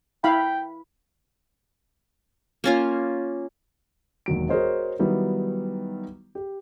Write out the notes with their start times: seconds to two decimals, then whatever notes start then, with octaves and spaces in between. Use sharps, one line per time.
0.24 E4 F5 G5 B5
2.64 A#3 C#4 F4
4.26 E1 D#2 F#3 D7
4.49 F#4 G#4 A#4 C5 C#5 D#5
4.99 D#3 F#3 G3 B3 E4
6.35 G4